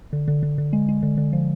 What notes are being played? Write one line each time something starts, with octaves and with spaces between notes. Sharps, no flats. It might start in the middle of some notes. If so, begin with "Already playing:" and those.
D3
D3
D3
D3
G#3
G#3
D3
D3
F3